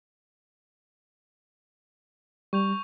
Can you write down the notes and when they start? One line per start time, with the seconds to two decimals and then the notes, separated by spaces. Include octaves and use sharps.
2.53 G3 C#6 G6 F7